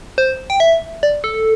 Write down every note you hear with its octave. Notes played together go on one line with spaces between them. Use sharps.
C5
G5
E5
D5
A4